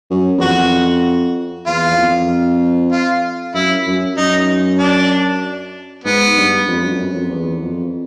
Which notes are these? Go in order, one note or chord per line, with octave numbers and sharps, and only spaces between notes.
F#2
E2
F2 F#4
E2 F4
E2
F2
F4
F#2 E4
F#2
F#2 D#4
D4
G#2 B3
G2
F2
F#2
F#2
F2
E2
F2